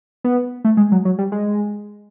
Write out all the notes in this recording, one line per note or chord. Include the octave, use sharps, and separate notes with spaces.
B3
A3
G#3
F#3
F#3
G3
G#3